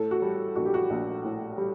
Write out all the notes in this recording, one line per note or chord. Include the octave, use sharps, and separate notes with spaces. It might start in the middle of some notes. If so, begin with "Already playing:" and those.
Already playing: A2 A4
F#4
G3
A#1 F#4
G4
F#4
A#1
A2
G3